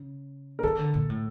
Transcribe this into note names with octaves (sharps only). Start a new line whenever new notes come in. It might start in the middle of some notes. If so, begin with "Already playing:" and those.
Already playing: C#3
A#4
D#3 A4
D3
A#2
A2